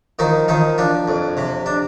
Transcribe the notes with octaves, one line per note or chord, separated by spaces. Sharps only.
D#3 F3 D#4
D#3 F3 D#4
F3 D4
F2
C3
D4